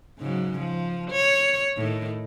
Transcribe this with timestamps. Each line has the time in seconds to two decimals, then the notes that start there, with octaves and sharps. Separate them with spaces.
0.19 G#2 C#3 F#3
0.59 F3
1.11 C#5
1.77 A2 D#3